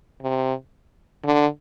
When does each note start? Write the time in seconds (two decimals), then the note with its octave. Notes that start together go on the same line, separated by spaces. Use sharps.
0.22 C3
1.25 D3